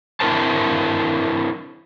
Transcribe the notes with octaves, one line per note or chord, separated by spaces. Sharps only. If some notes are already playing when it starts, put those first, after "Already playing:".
C4 D4 E4 A#4 C5 A5